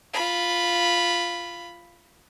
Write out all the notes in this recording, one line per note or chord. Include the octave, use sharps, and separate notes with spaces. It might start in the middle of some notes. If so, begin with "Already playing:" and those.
F4 B5